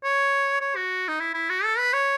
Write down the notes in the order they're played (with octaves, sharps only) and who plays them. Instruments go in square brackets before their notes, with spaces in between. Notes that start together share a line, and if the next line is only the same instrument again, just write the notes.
[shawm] C#5
C#5
F#4
D#4
E4
E4
F#4
A4
B4
C#5